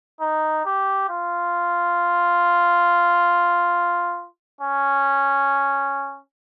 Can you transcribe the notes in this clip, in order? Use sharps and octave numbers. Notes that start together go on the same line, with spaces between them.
D#4
G4
F4
C#4